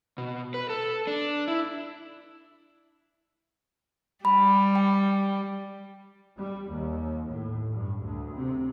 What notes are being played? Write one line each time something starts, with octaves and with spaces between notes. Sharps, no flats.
B2
B4
A4
D4
E4
G3 B5
G5
G3
D#2
A2
G2
D2
C3